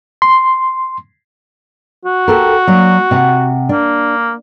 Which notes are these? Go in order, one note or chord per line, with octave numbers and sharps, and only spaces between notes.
C6
F#4
G4 A4 A#4
F#3 A#3 D4
C3 F#5
A#3 D4